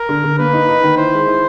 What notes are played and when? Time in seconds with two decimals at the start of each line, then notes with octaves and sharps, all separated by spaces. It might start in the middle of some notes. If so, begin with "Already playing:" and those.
Already playing: A#4
0.09 D3
0.24 D3
0.38 A#3 B4
0.53 D#4
0.69 D#4
0.84 D#3
0.97 E4 C5
1.13 G#3
1.28 E4